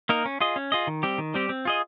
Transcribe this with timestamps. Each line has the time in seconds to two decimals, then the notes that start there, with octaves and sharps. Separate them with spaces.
0.09 A#3 D#4 A#4
0.25 C#4
0.41 F4 G#4 D#5
0.56 C#4
0.72 F4 G#4 D#5
0.87 D#3
1.03 G3 C4 G4
1.18 D#3
1.34 G3 C4 G4
1.49 C4
1.65 F4 G#4 D#5